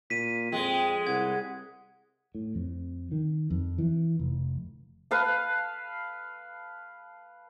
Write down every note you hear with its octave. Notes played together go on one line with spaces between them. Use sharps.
A#2 B6 D#7
F2 G#3 G5
C2 F#5 G#6
A2
F2
D#3
F2
E3
F1
B4 F5 A5